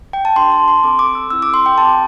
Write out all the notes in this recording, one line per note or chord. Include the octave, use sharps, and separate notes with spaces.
G5
A5
D4 G4 C6
A5
C6
C4 A4 D6
D6
E6
C4 E4 A4 E6
D6
C6
G5
C4 G4 A5